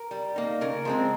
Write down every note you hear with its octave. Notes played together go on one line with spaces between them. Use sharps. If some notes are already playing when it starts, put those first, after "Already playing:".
Already playing: A#4
G3
A#3 D#4
C#3 A#4
F3 G#3 C4